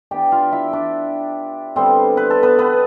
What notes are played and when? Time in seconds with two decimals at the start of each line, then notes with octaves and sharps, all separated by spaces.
0.11 E3 B3 D4 G4 G5
0.32 F4 F5
0.52 E4 E5
0.73 D4 D5
1.76 D3 G3 B3 C4 C5
2.17 B4
2.30 A4
2.43 B3 B4
2.59 B3 B4